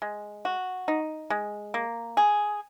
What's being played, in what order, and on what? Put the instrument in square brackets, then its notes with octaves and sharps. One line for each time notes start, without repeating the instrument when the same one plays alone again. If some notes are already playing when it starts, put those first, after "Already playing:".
[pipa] G#3
F#4
D#4
G#3
A#3
G#4